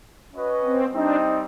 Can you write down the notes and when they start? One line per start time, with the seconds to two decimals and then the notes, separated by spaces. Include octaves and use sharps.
0.33 C#4 F#4 B4 D#5
0.64 C4
0.94 G3 C4 D4 D#4